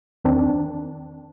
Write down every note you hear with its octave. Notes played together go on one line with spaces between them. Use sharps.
E2 D#3 C4 D4